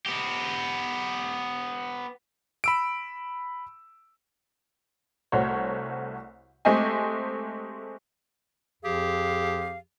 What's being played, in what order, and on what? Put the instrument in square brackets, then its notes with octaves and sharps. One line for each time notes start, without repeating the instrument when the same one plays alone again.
[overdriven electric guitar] B3 G4
[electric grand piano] B5 E6 D7
[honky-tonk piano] C2 A3 F#4 C5 C#5
G#3 A3 C4 G4 D#5 G#5
[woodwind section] F2 F3 G4 G#4 F5